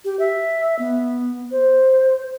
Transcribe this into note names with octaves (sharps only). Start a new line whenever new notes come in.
G4
E5
B3
C5